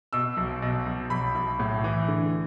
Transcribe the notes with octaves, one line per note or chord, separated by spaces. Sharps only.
B2 E6
B1
B2
B1
B1 B5
B1
A2
E3
D3